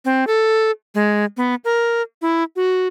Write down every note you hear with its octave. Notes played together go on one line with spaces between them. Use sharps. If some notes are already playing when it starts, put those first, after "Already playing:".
C4
A4
G#3
B3
A#4
E4
F#4